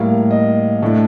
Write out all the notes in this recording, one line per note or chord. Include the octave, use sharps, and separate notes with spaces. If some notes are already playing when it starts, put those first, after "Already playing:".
Already playing: A2 G3 A#3 F5
D#5
A2 A3 D4